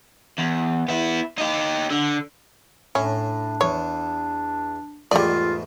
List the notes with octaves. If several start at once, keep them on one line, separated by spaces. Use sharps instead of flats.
E2
B3 E4
D#4 G4
D3
A2 C#4 D4
E2 C#5
E2 G#2 G3 A3 F4 D5